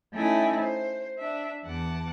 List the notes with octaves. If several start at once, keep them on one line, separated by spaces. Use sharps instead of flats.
A3 C#4 D#4 E4 G5 G#5
C5
D4 E5
E2 F#5 A5 D6